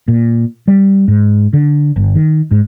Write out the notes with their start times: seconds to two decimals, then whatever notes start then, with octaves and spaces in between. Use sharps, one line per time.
0.08 A#2
0.68 G3
1.08 G#2
1.53 D3
1.96 G1
2.15 D#3
2.51 G#2